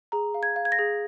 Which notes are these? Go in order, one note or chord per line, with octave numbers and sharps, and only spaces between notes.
G#4 A#5
F5
G#6
F5
G#6
A#6
G#4